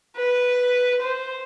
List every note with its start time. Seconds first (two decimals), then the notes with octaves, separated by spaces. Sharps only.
0.17 B4
1.01 C5